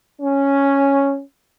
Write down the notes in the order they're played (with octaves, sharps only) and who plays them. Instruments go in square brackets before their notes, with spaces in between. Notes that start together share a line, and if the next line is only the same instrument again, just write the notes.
[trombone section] C#4